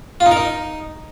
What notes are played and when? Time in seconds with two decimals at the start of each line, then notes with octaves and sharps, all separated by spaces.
0.20 F4
0.26 D#4
0.31 A#4
0.37 D#4